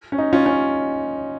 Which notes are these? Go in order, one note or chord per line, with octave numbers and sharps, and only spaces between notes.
C#4
D#4
C#4 F4
C#4